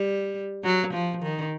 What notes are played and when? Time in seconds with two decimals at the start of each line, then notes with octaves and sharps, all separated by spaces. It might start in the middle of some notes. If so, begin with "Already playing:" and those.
Already playing: G3
0.64 F#3
0.94 F3
1.23 D#3